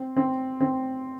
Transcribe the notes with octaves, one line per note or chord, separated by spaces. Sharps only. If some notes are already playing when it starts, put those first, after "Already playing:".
Already playing: C4
C4
C4